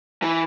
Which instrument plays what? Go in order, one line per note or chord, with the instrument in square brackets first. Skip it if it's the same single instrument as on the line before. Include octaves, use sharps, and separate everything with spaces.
[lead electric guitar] E3